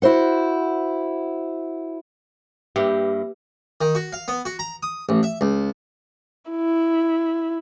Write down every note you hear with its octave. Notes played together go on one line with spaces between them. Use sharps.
E4 F#4 C5 F#5
G2 A#3 G4 B4 E5
D#3
F#4
F5
B3
F#4
A#5
D#6
A1
E5
C#2
E4